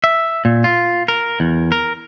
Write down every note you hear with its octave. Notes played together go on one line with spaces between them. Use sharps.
E5
A#2
F4
A#4
E2
A#4